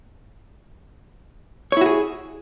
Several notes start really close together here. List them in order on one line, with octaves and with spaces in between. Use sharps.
C#5 E4 F#4 G#4